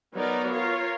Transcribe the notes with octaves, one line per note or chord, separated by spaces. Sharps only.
F#3 B3 D#4 A#4 D5
F4 A#4 C#5